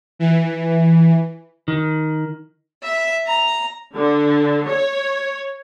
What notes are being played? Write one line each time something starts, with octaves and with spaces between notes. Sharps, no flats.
E3
D#3
E5
A#5
D3
C#5